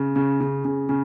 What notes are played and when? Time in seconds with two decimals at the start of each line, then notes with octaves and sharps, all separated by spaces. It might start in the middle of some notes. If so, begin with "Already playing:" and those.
Already playing: C#3
0.16 C#3
0.41 C#3
0.65 C#3
0.89 C#3